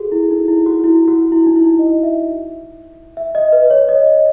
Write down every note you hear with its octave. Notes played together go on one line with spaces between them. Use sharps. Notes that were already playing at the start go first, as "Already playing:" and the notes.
Already playing: F#4 G#4 A4
E4
D#4
E4
F#4
E4
F#4
E4
D#4
E4
D#5
E5
E5
D#5
B4
C#5
D#5
D#5